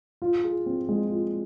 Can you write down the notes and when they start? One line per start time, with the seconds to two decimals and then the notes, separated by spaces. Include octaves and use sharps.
0.22 F4
0.44 G#4
0.66 C4
0.89 G#3
1.10 F4